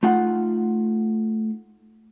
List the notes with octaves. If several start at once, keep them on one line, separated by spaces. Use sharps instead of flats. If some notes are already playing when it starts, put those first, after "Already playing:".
A3 D#4 F4 F#5